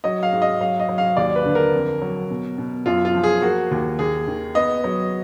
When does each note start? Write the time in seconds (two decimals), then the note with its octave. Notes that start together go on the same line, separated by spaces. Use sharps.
0.04 F#3 D#5
0.23 F5
0.33 G#2
0.42 D#5
0.61 F#3 F5
0.80 D#5
0.89 F#3
0.98 F5
1.17 D#2 D5
1.36 B4
1.45 D3
1.55 A#4
1.73 F2
2.02 F#3
2.30 B2
2.58 B2
2.86 F#2 F4
3.05 F4
3.15 F3
3.24 G#4
3.42 A#3 F#4
3.71 D#2
3.99 D#2 G#4
4.27 D#3
4.55 B3 D#5
4.84 F#3